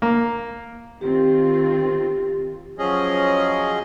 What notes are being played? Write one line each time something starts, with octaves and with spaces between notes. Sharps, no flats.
A#3
D#3 C4 F4 G4
F3 F#3 C#4 G#4 D#5